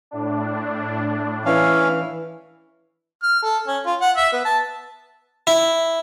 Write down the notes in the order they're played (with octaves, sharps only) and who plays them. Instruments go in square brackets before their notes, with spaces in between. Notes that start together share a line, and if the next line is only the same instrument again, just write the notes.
[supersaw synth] A2 D4
[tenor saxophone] E3 [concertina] C#4 F5
[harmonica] F6
A4
C#4
F4
F#5
E5
B3
A5
[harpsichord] E4